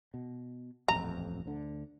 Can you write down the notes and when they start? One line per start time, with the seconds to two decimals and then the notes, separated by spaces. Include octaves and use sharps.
0.14 B2
0.88 D#1 A1 F2 A#5
1.46 D2 D3